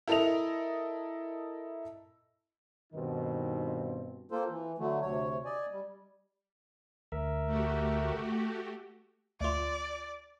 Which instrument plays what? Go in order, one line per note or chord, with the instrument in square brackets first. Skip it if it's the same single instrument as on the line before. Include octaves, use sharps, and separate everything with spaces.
[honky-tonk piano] E4 A4 A#4 D#5 F7
[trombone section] G2 B2 D#3 C4 D#4
[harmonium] A#3 C4 F4 A4 C5
E3
D3 F#3 A3
D2 C3 C#5
D5 D#5 G#5
G3
[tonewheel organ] D2 A#4 E5
[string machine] A3 F#4 G4
[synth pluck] D2 F4 [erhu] D5